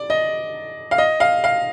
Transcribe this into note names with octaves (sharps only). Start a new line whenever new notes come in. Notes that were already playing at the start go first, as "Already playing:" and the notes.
Already playing: D5
D#5
F5
D#5
F5
F5